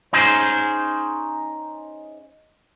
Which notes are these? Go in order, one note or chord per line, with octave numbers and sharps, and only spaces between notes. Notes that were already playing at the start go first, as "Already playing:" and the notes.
C#4 D#4 G#4 C5